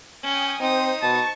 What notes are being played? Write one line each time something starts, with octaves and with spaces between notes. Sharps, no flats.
C#4 G5 G#5 D#6
C4 D#4 C5 D#6
B2 A5 C#6